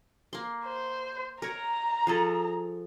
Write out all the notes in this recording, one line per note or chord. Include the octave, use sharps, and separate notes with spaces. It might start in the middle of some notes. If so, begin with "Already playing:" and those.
A#3 C6
C5
A#4 C#5 A#5
F3 G#4 A4